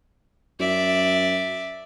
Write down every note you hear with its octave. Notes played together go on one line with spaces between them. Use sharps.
F#2 D5 E5